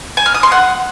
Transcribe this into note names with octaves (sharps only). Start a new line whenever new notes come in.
G#5
F6
D#6
C6
F#5